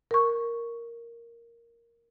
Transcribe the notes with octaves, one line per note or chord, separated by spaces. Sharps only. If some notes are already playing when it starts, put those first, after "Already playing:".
A#4 C#6